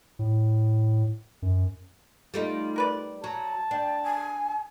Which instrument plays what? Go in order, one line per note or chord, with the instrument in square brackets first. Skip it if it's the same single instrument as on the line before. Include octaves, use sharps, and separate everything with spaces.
[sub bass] A2
F#2
[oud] G3 A3 D#4 [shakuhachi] F4
[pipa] A#4 B4 D5
[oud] F#3 [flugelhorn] A5 [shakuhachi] A#5
[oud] D4 [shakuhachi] G5
[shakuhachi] G#5